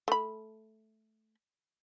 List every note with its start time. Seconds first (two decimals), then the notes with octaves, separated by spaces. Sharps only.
0.08 A3 B5